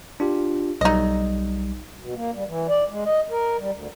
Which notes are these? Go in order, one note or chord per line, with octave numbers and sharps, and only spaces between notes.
D4 F4 G4
B1 G3 D#4 D#5
B2
A#3
G3
E3
D5
G#3
D#5
A#4
G3
D2